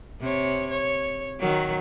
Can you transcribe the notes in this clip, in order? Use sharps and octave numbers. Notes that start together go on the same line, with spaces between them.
C3 C#5
C#5
D#3 F#3